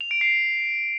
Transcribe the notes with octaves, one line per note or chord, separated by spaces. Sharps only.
F7
D7
C7